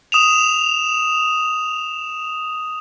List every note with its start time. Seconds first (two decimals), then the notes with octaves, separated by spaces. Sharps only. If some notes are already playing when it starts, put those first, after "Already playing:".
0.12 D#6 E7 F7